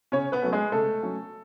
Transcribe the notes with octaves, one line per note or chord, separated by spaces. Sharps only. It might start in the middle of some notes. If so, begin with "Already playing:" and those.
C#3 C#4 C#5
B3 B4
F#3 A3 C#4
G#3 G#4
C#3 A3 A4
F#3 A3 C#4